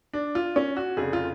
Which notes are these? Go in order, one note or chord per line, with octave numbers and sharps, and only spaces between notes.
D4
F4
C#4
F#4
F1 F2 C#3 G#4
F4